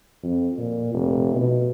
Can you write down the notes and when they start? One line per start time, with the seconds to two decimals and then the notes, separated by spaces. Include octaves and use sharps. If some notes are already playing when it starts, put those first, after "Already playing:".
0.23 F2
0.58 A#2
0.94 F1
1.35 B2